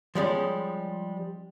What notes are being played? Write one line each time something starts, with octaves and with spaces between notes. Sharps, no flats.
F3 G3 G#3 C#4